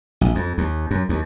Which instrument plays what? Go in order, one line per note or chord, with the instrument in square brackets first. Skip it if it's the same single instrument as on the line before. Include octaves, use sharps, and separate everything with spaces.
[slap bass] A#1
F2
D#2
F#2
D#2